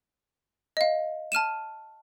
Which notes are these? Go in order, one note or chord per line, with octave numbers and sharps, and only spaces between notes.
D#5 F5
A5 F6 D#7 E7